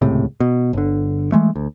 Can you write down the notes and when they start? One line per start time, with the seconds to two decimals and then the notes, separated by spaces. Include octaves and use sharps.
0.02 D#1 C#2 A2 C3
0.40 B2
0.73 G1 D3
1.32 E3 G#3 A3
1.56 D2